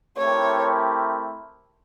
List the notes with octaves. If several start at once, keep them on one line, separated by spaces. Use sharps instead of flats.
A3 C4 E4 G4 A#4 C#5